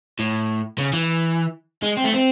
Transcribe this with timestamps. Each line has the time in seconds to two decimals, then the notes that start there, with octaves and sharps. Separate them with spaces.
0.19 A2
0.78 C#3
0.93 E3
1.83 G#3
1.98 C4
2.05 A3
2.14 C4